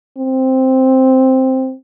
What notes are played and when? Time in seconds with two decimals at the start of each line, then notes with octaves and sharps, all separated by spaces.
0.18 C4